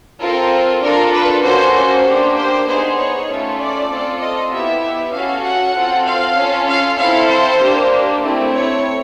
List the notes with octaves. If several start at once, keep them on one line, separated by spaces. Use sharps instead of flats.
C4 F4 A4 A#4
D4 F4 A4 A#4
B4
A#3 C#4 F#4 A4 C5
C5
A#3 D4 G4
C5
B3 D#4 G#4 C5
C#5
A3 C#4 F4
D5
C4 F4 A4
D#5
B3 E4 G4 E5
C#4 F#4 A4 F5
F#5
C4 F4 A4
F5
C#4 F4 A4
F5
C4 E4 A4 F5
C5
A#3 D4 G4
A3 C4 E4
C#5